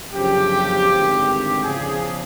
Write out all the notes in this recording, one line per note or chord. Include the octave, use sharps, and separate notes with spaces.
G1 F#2 C#3 F3 G4
G#1 G2 D3
G4
E2 C#3 F3 G#4